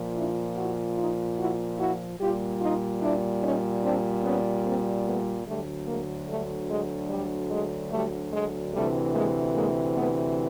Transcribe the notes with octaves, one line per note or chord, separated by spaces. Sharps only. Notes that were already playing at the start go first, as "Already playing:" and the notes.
Already playing: A#2 F3
D4 E4
E4 F#4
D#4 F4
E4 F#4
E4 F#4
A#2 G3 F4 G4
D#4 F4
D4 E4
C#4 D#4
C4 D4
B3 C#4
A#3 C4
A3 B3
D2 D3 F#3 G3 A3
G#3 A#3
G3 A3
G#3
G3
G#3
G3 A3
G#3
D2 C3 E3 G3 A3
G#3 A#3
G#3 A#3
A3 B3